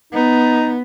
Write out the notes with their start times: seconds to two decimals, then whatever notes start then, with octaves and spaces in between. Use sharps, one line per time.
0.13 B3 D#4